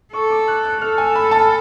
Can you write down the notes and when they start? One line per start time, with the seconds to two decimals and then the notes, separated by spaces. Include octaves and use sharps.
0.13 A4 C#6
0.30 D6
0.48 F#6
0.65 F#6
0.81 A4 F6
0.98 G#5
1.15 B5
1.31 A5